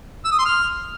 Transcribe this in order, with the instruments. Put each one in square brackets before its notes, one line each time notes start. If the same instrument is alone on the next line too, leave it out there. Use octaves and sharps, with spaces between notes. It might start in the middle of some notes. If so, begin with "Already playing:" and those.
[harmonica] E6
D#6
C6
F6